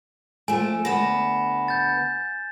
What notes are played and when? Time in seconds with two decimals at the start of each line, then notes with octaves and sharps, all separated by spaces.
0.48 F3 A3 G#5
0.85 D2 B3 A#6 E7
1.68 G6 A6